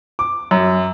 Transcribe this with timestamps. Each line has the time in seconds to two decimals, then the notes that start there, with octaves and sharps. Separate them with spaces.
0.19 D6
0.51 F#2